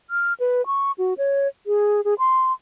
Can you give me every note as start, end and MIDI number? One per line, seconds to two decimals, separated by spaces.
0.10 0.33 89
0.40 0.65 71
0.66 0.92 85
0.98 1.14 66
1.18 1.48 73
1.67 2.01 68
2.05 2.14 68
2.19 2.52 84